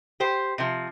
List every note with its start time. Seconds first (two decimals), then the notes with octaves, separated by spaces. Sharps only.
0.20 G4 C5
0.58 C3 F3